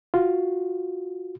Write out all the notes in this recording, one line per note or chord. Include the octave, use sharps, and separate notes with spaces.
F4 F#4